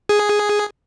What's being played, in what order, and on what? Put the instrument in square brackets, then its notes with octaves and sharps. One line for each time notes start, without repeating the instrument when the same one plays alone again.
[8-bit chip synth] G#4